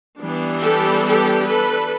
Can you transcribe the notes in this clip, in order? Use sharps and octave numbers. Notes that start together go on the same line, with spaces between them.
E3 G3 B3 D4
G4 A4
G4 A4
A4 B4